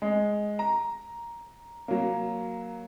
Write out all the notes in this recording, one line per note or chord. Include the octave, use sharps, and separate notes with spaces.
G#3
A#5
F#3 A#3